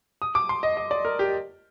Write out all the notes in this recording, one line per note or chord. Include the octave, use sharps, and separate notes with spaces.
D#6
D6
C6
D#5
D#5
D5
A#4
G4